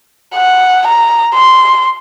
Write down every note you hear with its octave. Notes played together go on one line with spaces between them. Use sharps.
F#5
A#5
C6